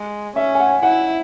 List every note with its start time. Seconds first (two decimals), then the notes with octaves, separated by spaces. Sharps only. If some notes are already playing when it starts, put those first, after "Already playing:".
Already playing: G#3
0.36 C#4 E5
0.55 G#5
0.60 F#5
0.83 E4 F#5